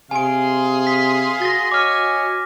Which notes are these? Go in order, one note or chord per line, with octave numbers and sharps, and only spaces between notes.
C3 G#4 F5 G#5 C6 D7
B6
F#4 A6 A#6
C#5 D#5 G#5 D6 F6